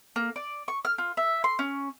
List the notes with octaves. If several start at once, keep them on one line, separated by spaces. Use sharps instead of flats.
A#3
D5
C#6
F6
F4
E5
C6
C#4